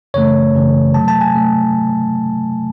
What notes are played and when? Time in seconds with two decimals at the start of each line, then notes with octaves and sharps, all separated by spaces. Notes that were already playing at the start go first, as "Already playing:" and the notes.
0.14 F#2 C#3 E3 A3 C#5
0.54 F#2 C#3 E3 A3
0.94 C3 F#3 A3 A5
1.08 A5
1.21 G#5
1.34 C3 F#3 A3